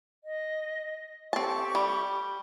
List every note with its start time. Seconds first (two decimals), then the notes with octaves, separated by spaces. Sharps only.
0.22 D#5
1.33 C4 G4 A4 A5 C#6
1.75 G3